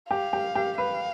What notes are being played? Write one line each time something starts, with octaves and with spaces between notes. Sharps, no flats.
G4 F5
G4
G4
B4 F5